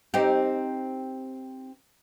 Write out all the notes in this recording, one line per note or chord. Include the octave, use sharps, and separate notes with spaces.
C4 D#4 G4